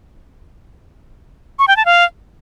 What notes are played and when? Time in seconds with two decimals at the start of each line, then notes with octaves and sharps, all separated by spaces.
1.59 C#6
1.68 G5
1.77 A5
1.85 F5